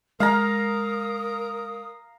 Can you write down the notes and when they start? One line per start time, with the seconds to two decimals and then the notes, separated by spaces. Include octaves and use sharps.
0.20 G#3 A#4 F5 A#5 D#6